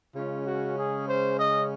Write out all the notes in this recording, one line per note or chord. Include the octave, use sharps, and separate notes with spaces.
C#3 G#3 C#4 F4
F#4
G#4
C5
D#5